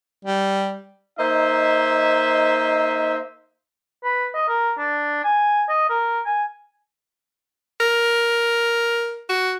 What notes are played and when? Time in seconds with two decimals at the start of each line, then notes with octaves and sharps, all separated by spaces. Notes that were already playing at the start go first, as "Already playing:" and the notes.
0.25 G3
1.18 A#3 D#4 C5 D#5 E5
4.04 B4
4.34 D#5
4.48 A#4
4.78 D4
5.24 G#5
5.69 D#5
5.90 A#4
6.26 G#5
7.80 A#4
9.30 F#4